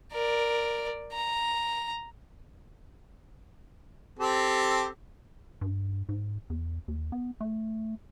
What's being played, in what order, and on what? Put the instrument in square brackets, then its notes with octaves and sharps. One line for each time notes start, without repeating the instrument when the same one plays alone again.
[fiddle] A#4 D5
A#5
[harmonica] C4 G4 A4
[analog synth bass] G2
G#2
E2
D#2
B3
A3